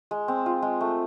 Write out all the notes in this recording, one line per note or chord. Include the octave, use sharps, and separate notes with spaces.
G#3
C4
F4
G#3
A3